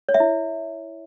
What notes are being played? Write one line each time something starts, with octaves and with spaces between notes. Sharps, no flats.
C#5
E5
E4